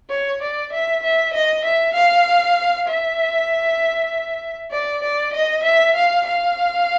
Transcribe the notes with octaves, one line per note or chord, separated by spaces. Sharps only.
C#5
D5
E5
E5
D#5
E5
F5
E5
D5
D5
D#5
E5
F5
F5